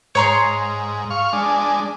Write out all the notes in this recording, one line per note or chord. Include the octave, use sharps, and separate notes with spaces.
G#2 C#5 A#5 C6
F5 C#6
G#3 D4